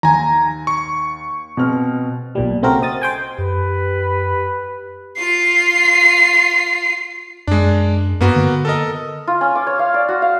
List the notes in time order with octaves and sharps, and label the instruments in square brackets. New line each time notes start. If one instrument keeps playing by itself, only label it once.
[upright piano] D#2 [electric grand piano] G#5 A#5
[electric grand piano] C#6
[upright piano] B2 C4 F6
[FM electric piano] B1 A#2 G3
C#3 A3 C4 F#4 A#4
D#5 D#6 A6
C5 G5 G#5
[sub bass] F#2 [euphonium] G4 [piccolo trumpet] B4
[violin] F4 C7
[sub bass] F#2 [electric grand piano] G#3 D4
[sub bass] G2 [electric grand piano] A#3 B3 F#4
[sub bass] D3
[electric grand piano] A4 A#4 D#5
[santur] F4
C#4
D6
C#5
F5
D5
F#4
F5